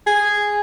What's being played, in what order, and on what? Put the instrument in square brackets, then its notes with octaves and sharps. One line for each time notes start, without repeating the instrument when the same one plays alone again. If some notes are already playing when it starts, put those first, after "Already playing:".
[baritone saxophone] G#4